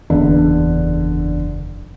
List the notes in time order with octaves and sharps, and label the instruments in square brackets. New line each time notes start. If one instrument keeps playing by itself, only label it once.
[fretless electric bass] F#1 E2 [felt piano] D3